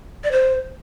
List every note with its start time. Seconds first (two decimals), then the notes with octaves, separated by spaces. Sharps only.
0.24 D5
0.31 C5